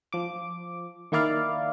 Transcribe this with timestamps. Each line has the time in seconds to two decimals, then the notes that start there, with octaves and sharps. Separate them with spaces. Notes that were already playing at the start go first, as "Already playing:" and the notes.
0.13 F3 D6
1.12 D#3 A#3 E4 D5 F5